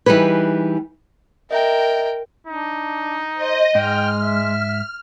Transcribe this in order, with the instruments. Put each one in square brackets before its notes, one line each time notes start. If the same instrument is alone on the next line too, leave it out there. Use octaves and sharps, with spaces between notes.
[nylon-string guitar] E3 G3 D#4 G#4 B4
[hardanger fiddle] A#4 G5 [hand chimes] D#5 E5 A#5
[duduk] D4 [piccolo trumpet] D#4
[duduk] C5 [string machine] D#5
[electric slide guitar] G#2 [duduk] G#3 [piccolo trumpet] G5 [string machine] F6
[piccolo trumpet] E5